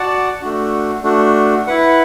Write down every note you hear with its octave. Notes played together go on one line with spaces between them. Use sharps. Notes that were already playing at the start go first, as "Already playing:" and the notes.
Already playing: F#4 D5 F#5 A5
A3 D4 F#4
A3 D4 F#4
E4 B4 F#5